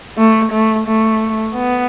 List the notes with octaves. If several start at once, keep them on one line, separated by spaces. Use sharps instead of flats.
A3
A3
A3
B3